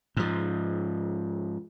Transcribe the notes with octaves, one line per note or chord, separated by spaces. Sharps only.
G#2 F3